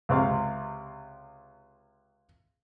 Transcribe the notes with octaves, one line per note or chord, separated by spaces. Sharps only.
C#2 C3 F5